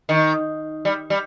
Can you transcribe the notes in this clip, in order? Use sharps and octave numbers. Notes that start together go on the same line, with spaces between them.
D#3
G3
G3